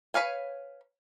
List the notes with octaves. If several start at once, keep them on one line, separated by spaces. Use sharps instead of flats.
B4 C#5 F5 G#5